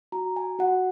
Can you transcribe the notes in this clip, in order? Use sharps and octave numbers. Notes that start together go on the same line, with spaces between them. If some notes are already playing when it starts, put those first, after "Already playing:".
F#4 A#5
G#5
F#4 F#5